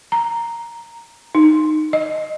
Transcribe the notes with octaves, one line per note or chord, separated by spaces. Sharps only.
A#5
D#4
D#5